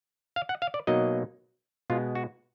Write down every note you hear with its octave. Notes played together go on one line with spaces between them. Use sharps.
F5
F#5
F5
D5
B2 F#3 A#3 D#4 D#5
B2 G#3 B3 F4
F#4